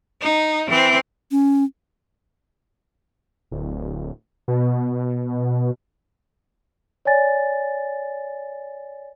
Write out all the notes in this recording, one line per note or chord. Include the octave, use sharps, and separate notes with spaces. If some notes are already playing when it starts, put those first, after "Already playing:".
D#4
E3 C4
C#4
D1
B2
C#5 D5 G#5 A6